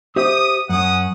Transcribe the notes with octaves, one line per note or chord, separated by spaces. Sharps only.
G4 C5 E5 D#6
F#2 C#4 F#5 D#6